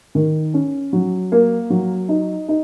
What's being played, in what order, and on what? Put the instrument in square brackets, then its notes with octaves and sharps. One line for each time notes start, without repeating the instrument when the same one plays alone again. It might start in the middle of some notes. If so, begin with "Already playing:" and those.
[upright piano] D#3
C#4
F#3
A#3
F#3
D#4
D#4